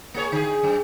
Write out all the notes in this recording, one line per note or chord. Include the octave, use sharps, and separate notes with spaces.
A#3 G#4 C#5
D3 G#4
F#2